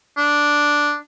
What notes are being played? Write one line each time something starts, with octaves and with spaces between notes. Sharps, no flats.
D4